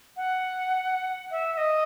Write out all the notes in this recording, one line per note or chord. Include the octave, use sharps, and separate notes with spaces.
F#5
E5
E5
D#5